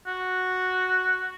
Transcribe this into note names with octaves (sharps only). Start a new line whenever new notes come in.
F#4